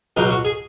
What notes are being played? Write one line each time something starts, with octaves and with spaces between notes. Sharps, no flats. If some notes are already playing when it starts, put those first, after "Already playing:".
C#2 B2 F#3 D#4
F#4
G#4